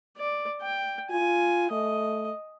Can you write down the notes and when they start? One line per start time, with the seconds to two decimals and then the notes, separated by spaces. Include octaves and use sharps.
0.17 D5
0.62 G5
1.10 F4 G#5
1.71 A3 D#5